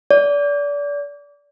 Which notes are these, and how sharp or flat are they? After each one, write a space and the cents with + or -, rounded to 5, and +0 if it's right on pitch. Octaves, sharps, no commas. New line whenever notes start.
D5 -30